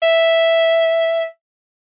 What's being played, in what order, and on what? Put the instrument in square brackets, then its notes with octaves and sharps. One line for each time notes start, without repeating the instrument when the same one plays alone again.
[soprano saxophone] E5